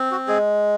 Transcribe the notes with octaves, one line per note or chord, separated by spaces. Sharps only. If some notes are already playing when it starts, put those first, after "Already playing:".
Already playing: C4
F#4
G#3 G#4